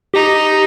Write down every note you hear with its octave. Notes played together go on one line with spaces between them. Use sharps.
D#4 G4